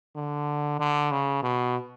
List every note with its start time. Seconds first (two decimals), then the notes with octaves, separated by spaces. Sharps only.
0.16 D3
0.79 D3
1.12 C#3
1.43 B2